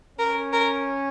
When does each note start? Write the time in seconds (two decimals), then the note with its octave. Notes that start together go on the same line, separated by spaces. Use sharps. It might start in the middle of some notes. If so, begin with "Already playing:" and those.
0.19 C#4 A#4
0.53 A#4